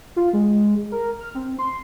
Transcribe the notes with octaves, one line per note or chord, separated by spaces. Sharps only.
F4
G#3
A#4
F6
C4
C6